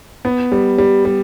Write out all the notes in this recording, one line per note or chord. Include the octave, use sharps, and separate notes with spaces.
B3
G3
G3
G3